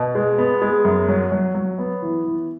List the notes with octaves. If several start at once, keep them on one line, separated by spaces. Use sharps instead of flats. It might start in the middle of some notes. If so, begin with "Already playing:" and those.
Already playing: B2
G#3
B3
G#3
F#2
F#3
F#3
F#3
B3
E3
E3